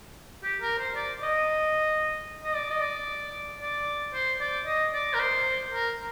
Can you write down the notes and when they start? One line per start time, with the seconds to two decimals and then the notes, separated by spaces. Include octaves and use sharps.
0.43 G4
0.61 A#4
0.78 C5
0.95 D5
1.23 D#5
2.44 D#5
2.55 D5
2.71 D#5
2.81 D5
3.61 D5
4.14 C5
4.41 D5
4.66 D#5
4.93 D5
5.14 A#4
5.19 C5
5.72 A#4